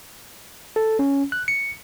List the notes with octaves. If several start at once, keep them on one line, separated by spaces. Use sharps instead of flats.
A4
C#4
F#6
C#7